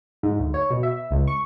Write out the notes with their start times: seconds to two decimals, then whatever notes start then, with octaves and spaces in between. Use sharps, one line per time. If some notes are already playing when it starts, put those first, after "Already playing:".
0.23 G#2
0.39 D2
0.54 C#5
0.70 B2
0.83 E5
1.11 C#2
1.28 C#6